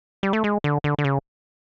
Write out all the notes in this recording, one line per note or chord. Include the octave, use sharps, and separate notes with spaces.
G3
A3
G#3
D3
D3
D3
C#3